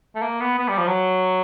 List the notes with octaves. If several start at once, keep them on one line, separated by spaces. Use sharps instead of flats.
A3
A#3
B3
B3
G3
F3
F#3